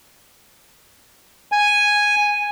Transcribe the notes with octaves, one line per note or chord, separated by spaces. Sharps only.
G#5